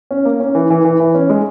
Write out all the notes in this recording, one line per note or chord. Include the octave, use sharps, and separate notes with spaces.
C#4
A#3
C#4
E3
E3
E3
E3
C#4
G#3